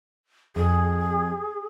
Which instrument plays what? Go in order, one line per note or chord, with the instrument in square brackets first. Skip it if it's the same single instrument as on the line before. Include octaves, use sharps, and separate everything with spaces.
[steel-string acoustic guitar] F2 [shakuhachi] G#4